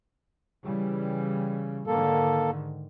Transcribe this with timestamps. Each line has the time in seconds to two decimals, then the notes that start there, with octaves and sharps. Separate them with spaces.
0.63 C#3 E3 G3
1.87 G#2 D3 D#3 A#3 A4